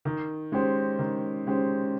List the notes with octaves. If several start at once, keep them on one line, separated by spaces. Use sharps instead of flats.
D#3
G#3 C#4 G4 C5
D#3
G#3 C#4 G4 C5